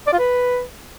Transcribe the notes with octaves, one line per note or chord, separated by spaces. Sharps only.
D5
F4
B4